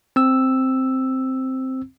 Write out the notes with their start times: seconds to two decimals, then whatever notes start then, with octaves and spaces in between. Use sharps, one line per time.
0.16 C4 E6